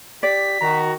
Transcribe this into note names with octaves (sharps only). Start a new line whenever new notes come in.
G4 D5 B6
D#3 F#4 A#5